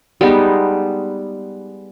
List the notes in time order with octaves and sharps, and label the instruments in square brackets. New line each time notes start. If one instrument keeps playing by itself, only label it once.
[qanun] G3 G#3 B3 D#4